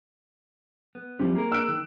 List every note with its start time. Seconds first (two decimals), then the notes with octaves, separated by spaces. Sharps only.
0.95 B3
1.19 E3 F3 G3 C4
1.35 A#3 G#4 A#4
1.52 E6 F#6 D7
1.68 D#3